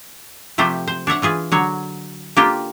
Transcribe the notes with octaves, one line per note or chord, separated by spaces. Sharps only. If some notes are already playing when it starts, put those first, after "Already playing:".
C3 F3 A3 G4 C5
C5
D4 C#5 E5 F#5
E3 F4 G#4 B4
D3 F#3 C#5
A#3 D4 F4 G4 A4